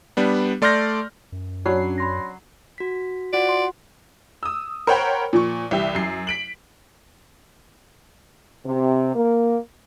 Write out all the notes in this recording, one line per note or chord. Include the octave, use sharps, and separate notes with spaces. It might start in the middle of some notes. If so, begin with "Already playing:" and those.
G3 B3 D4
A3 D5 C6 F6 G6 A#6
F#2
F#3 C#4 D4 B5 C7
B5 C6 A#6
F#4 B6
F4 F#4 D5 F#5
C6
D#6 E6
A#4 C5 C#5 F#5 G5 B5
A#2 F3 C#6
C2 E3 G4 E5
F#2 C7
B6 D7 F#7
C3
A#3